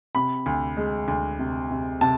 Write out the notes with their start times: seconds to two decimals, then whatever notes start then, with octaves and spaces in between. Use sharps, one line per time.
0.15 C3 B5
0.46 D2
0.77 G#3
1.08 D2
1.39 C3
1.70 C3
2.01 C3 A5